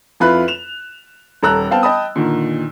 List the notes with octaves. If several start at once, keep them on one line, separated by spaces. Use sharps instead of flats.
F2 E4 F4 B4 B5 F#6
E7 F7
D#1 A4 A#5 E6 F#6
B3 C4 F5 G5 A5
D#5 G5 A5 B5 D#6
A#2 D3 D#3